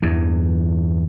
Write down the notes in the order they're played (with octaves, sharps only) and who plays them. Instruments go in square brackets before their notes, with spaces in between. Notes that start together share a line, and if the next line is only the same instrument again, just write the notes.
[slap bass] E2 G2 E3